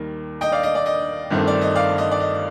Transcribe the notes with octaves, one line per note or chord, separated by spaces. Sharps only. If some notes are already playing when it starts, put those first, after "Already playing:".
Already playing: D#2 D#3 G3 A#3
D#5 G5
D5 F5
D#5
D5
D#5
G1 G2 D#3 A3 C4
D5
D#5
D5 F5
D#5
D5
D#5